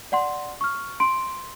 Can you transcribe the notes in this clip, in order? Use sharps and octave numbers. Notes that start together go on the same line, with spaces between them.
D5 F#5 C6
C#6 F6
C6 D7